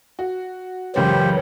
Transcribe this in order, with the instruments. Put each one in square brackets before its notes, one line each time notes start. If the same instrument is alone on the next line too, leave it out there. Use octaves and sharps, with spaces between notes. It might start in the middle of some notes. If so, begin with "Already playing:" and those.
[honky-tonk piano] F#4
[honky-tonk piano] F#1 C#2 C#3 [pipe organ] E3 F#3 [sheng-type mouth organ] G4 C5